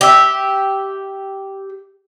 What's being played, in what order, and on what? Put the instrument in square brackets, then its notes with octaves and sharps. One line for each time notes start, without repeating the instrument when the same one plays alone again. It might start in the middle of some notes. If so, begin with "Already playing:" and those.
[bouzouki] G4 E5